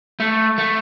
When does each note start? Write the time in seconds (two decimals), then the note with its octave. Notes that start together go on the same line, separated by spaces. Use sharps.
0.20 A3
0.59 A3